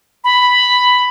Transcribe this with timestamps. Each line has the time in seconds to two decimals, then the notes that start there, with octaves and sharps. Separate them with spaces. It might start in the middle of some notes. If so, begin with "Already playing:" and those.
0.24 B5